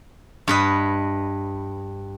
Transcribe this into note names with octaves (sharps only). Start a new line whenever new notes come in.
G2 B4 D#5